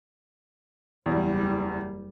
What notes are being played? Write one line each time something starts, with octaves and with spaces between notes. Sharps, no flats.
F#1 E2 G3